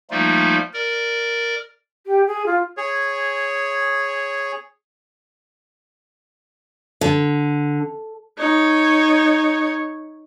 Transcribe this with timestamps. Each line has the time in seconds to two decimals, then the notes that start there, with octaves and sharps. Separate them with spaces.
0.11 F3 G3 A3 A#3 D#4 F4
0.74 A#4 D5
2.06 G4
2.27 G#4
2.46 F4
2.77 G#4 C#5
7.01 D3
8.38 D#4 C#5